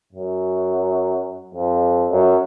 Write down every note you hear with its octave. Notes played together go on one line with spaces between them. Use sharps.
F#2
F2
F#2